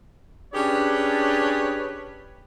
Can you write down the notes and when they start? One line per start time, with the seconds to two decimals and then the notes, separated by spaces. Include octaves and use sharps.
0.54 C#4 D4 G4 G#4 B4 C#5